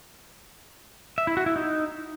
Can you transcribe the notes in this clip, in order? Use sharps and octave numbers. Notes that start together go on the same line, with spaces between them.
E5
E4
F#4
E4
D#4